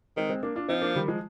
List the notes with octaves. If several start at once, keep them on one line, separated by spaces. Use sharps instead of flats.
D#3 G#3 C4
G#3 C4
A#3 D4
D4 F4
F3 C4 D#4
A#3 D4
D#3 G3
F3 G#3